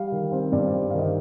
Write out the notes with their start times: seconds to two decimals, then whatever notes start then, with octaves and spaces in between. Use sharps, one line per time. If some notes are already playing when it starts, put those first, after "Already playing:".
Already playing: G3 F5
0.12 D#3
0.32 C4
0.52 G2 D5
0.72 G3
0.90 F5
0.94 D#3 D#5